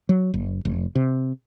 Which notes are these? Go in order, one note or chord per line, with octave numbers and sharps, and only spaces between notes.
F#3
F#1
F1
C3